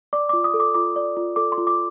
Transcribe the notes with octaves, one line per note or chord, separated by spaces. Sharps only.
D5 D6
D6
F4
D#6
A4
D6
F4 D6
D5
F4
A4 D6
C6
F4
D6